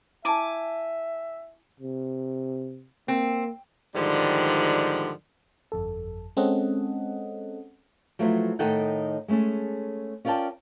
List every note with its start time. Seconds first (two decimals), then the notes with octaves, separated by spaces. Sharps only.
0.25 E4 E5 G#5 A5 D6
1.80 C3
3.08 A#3 C4
3.95 G#2 D3 D#3 F3 G3
5.72 G1 F2 A4
6.37 G#3 C4 C#4 A4 D#5 F#5
8.19 F3 F#3 A3 B3 E4 C5
8.59 A2 D#3 D#4 A4 F#5 G5
9.28 G#3 A3 C#4 G#4 A4
10.25 C#4 F4 A#4 D5 G5 A5